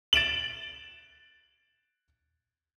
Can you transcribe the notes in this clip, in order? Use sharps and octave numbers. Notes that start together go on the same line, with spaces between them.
A6 D7 E7 F#7